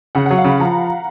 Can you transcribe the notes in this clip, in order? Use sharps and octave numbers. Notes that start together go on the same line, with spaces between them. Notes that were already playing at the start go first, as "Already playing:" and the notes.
C#3 F#5
F#3 F#5
F5
C#3 B5
F3 A#5